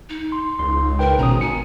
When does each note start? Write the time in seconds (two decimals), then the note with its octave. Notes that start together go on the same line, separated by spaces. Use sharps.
0.09 D#4
0.32 C6
0.59 C#2 C6
0.99 A#4 B4 G5
1.18 G#1 B2 C#4 A#5 D#6
1.41 G#5 C#7